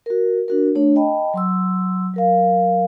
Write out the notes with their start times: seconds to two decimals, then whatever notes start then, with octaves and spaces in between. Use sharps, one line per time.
0.06 F#4 A#4
0.48 D4 F#4 A#4
0.75 A3 D4 C#5
0.96 D#5 G5 A5 B5
1.34 F#3 C6 E6
2.14 F#3 A#4 F5